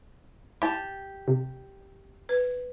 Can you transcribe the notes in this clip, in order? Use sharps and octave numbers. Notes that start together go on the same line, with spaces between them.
E4 G4 A5
C3
B4